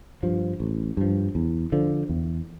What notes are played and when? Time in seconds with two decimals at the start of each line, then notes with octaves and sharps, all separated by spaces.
0.23 G2 F3
0.60 A1
0.97 G2 F3
1.35 E2
1.72 D3 F3
2.09 E2